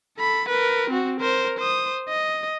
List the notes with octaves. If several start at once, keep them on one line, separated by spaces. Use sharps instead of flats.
A4 B5
A#4 B4
C4 F#4
A#4 C5
C5 D#6
D#5